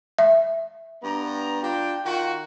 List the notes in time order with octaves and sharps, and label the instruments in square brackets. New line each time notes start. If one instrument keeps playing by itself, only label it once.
[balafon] E5
[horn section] G2 B3 A#5
D4 F4 G5
D#3 F4 F#4